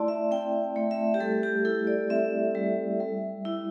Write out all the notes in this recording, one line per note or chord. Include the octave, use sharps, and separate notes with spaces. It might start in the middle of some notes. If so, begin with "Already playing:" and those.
Already playing: A3 E4 D5 A5 C6
E5
C4 G5
A3
E5
G4
G3 A4
G4
E4 A4
D5
C4 E5
G3
G3
E4